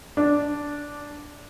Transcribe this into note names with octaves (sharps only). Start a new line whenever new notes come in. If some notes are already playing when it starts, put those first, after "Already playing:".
D4